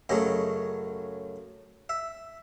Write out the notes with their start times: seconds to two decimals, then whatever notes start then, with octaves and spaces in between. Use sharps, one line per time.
0.09 F#2 C#3 F#3 A3 D#5
1.89 E5